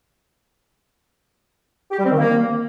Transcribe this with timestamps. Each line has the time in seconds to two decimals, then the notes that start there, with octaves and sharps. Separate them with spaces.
1.91 G4
1.98 G3
2.04 C4
2.11 D#3
2.18 A#3